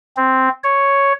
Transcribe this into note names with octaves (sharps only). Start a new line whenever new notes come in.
C4
C#5